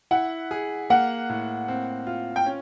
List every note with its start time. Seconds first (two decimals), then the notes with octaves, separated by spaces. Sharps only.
0.11 E4 F#5
0.51 G#4
0.90 A#3 F#5
1.29 A2
1.68 C4
2.07 F4
2.36 G5
2.46 C#4